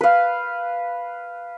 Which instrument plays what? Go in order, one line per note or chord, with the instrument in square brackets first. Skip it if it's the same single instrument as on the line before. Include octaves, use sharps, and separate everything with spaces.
[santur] B4 F5